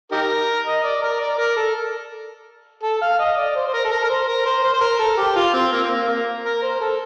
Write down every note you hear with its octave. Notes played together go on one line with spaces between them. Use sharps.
D#4 G4 A#4
D#5
D5
A#4
D5
A#4
A4
A4
F5
D#5
D5
C5
C5
A#4
A4
A#4
A#4
C5
A#4
C5
C5
C5
A#4
A4
G4
F4
C4
A#3
C4
A#3
A#3
A#4
C5
A4